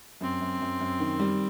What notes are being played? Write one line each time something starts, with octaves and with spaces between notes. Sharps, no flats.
F#2 C4
F#2
F#2
F#2
D#3
G3